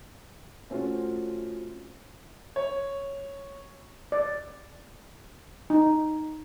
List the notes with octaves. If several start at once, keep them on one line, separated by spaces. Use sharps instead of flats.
A3 C4 C#4 F4 F#4
C#5
D5
D#4